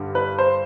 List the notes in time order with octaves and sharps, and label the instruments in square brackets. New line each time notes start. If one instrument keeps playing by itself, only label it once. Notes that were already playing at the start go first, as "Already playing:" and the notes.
Already playing: [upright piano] G2 D3 G3
[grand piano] B4
C5